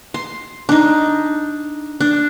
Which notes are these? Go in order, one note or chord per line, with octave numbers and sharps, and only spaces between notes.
C6
D4 D#4
D4